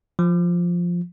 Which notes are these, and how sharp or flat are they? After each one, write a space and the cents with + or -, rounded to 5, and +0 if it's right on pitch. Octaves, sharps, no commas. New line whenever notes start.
F3 +0